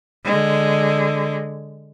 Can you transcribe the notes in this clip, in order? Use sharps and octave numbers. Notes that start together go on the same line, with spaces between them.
D3 G#3